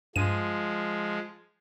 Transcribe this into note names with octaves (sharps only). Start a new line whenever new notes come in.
G2 F3 G#3 D#7